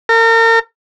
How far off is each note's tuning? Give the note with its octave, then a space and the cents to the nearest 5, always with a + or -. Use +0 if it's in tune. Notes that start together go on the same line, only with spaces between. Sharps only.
A#4 -40